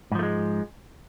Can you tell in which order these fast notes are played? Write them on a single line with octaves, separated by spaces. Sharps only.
G#2 F3 A3 G#3